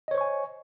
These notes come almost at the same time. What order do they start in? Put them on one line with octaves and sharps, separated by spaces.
D#5 C#5 C5 C#6 G#5